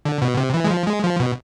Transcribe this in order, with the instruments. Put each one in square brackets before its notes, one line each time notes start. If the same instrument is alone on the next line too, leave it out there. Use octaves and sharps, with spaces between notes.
[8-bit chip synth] D3
B2
C3
E3
G#3
F3
G#3
F3
B2